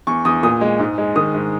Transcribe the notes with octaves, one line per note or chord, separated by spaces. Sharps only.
E2 C#6
E2 D#6
A#2 D#6
G#3
G#2
G#3
D#3 D#6
G#2